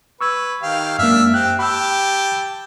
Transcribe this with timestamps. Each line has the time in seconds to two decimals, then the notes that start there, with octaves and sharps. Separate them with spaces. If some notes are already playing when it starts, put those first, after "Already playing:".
0.21 B4 C#6 E6 G#6
0.62 D#3 G4 F5
0.99 F#2 G#3 A#3 D4 E5 F6
1.34 C4 G4 F#6
1.59 G4 A5 B5 E6